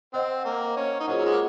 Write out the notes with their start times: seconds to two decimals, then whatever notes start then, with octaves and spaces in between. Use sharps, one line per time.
0.14 C4 C5 D#5 F#5
0.45 A#3
0.77 C#4
1.00 D#4
1.07 F#3 A#3 C#4 F4 G#4 C5 D#5 F#5
1.17 F#3
1.25 G#3
1.31 A#3